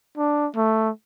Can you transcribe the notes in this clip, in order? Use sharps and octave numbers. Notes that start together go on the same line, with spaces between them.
D4
A3